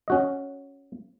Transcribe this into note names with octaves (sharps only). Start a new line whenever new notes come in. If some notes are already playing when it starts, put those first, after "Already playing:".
C#4 F#4 D#5